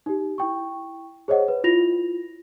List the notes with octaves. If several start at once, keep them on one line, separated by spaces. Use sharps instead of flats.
D#4 G4
E4 G5 C#6
G#4 C5 C#5 D#5 F#5
B4
E4 F4 A#6 F7